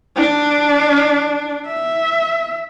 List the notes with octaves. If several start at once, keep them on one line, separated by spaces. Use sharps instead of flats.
D4
E5